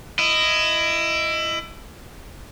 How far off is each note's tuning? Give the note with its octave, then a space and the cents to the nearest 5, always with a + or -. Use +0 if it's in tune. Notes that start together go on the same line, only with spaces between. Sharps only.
E4 +20 D#5 +0